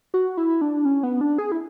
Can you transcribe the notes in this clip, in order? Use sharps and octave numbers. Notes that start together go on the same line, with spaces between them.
F#4
E4
D4
C#4
B3
D4
G#4
E4